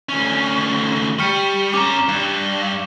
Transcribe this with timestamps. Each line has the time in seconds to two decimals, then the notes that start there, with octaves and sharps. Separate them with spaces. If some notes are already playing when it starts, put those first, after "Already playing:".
0.09 D2 C#4
1.19 G3 C#6 F6 C#7
1.74 C#4 A#5 D6
2.08 G2